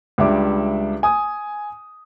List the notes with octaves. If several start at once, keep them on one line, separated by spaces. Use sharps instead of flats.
C#2 G3 D4 E5 D6
G#5 D#6